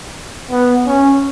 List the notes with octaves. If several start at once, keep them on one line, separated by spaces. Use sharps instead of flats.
B3
C#4